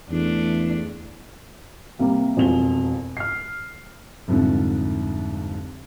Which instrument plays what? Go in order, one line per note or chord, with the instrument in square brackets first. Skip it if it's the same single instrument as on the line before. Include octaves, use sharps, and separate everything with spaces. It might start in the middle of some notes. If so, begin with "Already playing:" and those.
[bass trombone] E2 [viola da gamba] A3 D4
[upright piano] C3 G3 A#3
E1 F2 F7 G7
F6 C7
[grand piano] C2 F2 G#2 D3